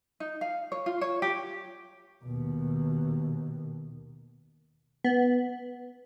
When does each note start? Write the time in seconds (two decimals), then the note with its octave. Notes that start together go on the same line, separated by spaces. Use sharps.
0.20 D#4
0.41 F5
0.72 C#5
0.86 F4
1.01 C#5
1.22 G4
2.24 D#2 B2
5.04 B3